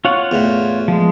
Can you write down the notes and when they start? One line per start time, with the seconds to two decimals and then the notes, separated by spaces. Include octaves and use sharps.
0.05 F4 C#5 F#5
0.31 E2 A2
0.88 F3 G#3